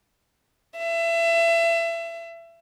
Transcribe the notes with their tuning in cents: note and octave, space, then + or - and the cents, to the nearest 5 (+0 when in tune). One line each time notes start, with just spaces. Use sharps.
E5 +30